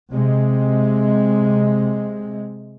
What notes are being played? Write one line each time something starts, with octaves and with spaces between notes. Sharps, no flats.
C3 G#3